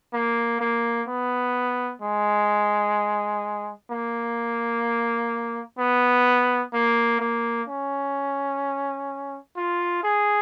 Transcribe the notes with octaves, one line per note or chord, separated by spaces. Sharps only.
A#3
A#3
B3
G#3
A#3
B3
A#3
A#3
C#4
F4
G#4